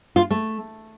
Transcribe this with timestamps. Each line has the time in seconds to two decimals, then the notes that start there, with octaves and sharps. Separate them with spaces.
0.16 F4
0.30 A3